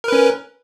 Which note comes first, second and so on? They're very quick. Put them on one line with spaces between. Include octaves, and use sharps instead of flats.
A#4 B4 C#4